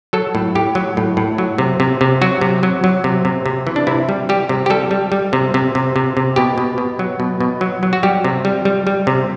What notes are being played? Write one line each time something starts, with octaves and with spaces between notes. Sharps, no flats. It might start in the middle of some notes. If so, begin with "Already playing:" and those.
F#3 A4
A2
A2 G4
F#3
A2
A2
F#3
C3
C3
C3
F#3 F#4
C3
F#3
F#3
C3
C3
C3
E3
D4
C3 E4
G3
G3 G4
C3
G4
G3 A4
G3
G3
C3
C3
C3
C3
C3
B2 G4
B2
B2
F#3
B2
B2
F#3
F#3
F#4
G3 G4
C3
G3
G3
G3
C3